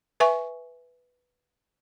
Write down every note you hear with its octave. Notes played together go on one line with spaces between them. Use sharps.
B4 E5 G#5 C#6